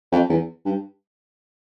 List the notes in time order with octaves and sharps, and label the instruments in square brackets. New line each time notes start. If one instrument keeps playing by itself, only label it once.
[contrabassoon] F2
E2
G2